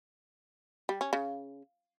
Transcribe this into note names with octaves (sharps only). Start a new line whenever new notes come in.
G3
C#4
C#3